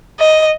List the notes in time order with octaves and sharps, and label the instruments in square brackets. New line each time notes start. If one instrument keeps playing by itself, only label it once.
[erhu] D#5